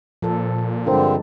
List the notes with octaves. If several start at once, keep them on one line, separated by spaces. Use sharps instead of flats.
A#2 F3 A4
G2 D3 G#3 C4 D4 F4 A#4 C5